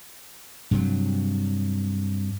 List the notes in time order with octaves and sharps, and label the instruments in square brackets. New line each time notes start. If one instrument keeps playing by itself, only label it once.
[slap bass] G2 C3 F#3